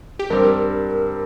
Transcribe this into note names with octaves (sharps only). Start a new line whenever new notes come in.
G4
G2 G3 C4 A#4